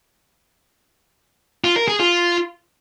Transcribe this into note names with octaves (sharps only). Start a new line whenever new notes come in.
F4
A#4
G#4
F4